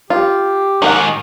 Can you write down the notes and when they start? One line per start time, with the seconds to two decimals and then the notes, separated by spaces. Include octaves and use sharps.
0.10 F4 G4
0.82 G#2 D#3 D#4 A#4 F#5